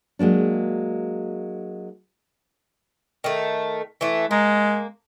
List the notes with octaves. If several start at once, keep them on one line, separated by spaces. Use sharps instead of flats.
F#3 G#3 A#3 D4
D#3 A3
E3 A3
G#3 A#3